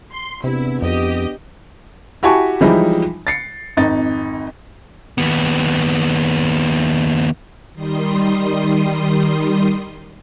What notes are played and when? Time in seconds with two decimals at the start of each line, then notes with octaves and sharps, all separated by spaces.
0.12 C6
0.44 E2 C3 B3 D4 E4
0.82 F2 G4 D#5
2.23 E4 F#4 G4 G#5 A5 C#6
2.61 E3 F3 G3 G#3 D#4 E4
3.27 A6 C7 C#7
3.77 G#1 F2 D#4 A6
5.18 D#2 B3
7.74 D#3 G3 C6 D#6